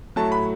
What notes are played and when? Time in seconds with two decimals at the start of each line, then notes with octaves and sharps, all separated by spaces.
0.16 A2 F#3 A3 A5
0.32 B5